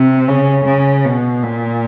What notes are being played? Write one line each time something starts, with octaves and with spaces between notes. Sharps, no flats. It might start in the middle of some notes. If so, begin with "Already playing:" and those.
Already playing: C3
C#3
C#3
B2
A#2